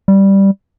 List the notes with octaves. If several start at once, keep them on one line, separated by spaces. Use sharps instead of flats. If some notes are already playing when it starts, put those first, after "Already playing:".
G3